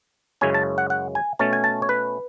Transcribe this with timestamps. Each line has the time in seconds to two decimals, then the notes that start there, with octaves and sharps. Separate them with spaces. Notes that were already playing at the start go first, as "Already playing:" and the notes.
0.41 F#2 C#3 G#3 C#4 E4 G#5
0.54 A5
0.78 F#5
0.90 F#5
1.15 G#5
1.39 B2 A3 C#4 A5
1.53 G#5
1.64 A5
1.82 C#5
1.89 B4